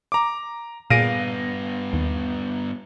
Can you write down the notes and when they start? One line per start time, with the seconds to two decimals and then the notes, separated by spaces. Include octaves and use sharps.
0.12 A#5 D6
0.90 G2 A#2 B3 G#4 F5 A#6 D7 D#7
1.93 D#2